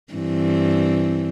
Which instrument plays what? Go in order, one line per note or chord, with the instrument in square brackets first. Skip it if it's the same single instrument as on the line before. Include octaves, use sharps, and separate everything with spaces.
[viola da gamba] G2 E3 C4